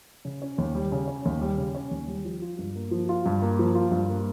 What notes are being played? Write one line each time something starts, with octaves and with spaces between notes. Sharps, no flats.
C#3
C#4
D#2
G3
C#3
C#4
D#2
G3
C#3
C#4
D#2
G3
F3
F4
G2
A#3
F3
F4
G2
A#3
F3
F4
G2
A#3